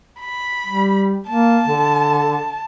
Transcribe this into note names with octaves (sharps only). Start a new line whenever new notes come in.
B5
G3
A#3 A5
D3